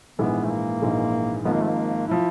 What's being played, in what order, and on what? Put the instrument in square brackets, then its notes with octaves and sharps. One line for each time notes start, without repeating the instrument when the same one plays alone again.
[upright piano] A#1 G#2 E3 G#3 [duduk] B3
[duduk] A3
A#3
[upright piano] A#1 G#2 E3 G#3
[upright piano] G#1 G#2 F3 [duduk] B3
[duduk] A#3
A3
A#3
[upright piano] F3 [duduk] E4